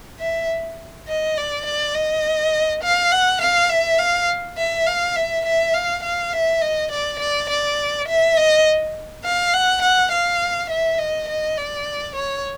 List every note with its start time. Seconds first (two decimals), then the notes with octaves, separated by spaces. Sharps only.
0.20 E5
1.08 D#5
1.37 D5
1.66 D5
1.95 D#5
2.83 F5
3.12 F#5
3.41 F5
3.70 E5
3.99 F5
4.58 E5
4.87 F5
5.16 E5
5.45 E5
5.74 F5
6.04 F5
6.33 E5
6.62 D#5
6.92 D5
7.19 D5
7.49 D5
8.08 E5
8.37 D#5
9.24 F5
9.54 F#5
9.82 F#5
10.12 F5
10.70 E5
10.99 D#5
11.28 D#5
11.58 D5
12.16 C#5